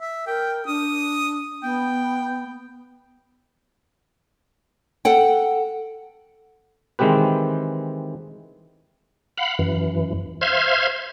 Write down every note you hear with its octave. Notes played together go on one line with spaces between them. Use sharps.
E5
A#4 G5
D4 D#6
B3 G5
A4 F#5 G5
D#3 E3 G#3 C4 G4 B4
F5 F#5 B5
F#2 E3
C5 E5 F5 C6 F6 G#6